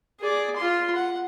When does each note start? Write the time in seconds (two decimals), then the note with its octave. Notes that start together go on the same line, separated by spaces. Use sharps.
0.20 G#4 D5
0.56 F4 C6
0.96 F#5